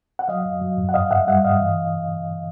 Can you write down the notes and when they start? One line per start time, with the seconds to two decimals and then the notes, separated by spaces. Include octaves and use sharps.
0.19 F#5
0.28 F#3 D#5 F5
0.45 F#2
0.62 F#3
0.78 F#2
0.89 F#5
0.94 G2 D#5 F5
1.11 G2 E5 F#5
1.27 G3 E5 F#5
1.44 G2 D#5 F5
1.61 E3